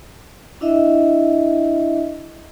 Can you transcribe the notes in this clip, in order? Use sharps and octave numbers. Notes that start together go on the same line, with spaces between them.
D4 E4 D#5 E5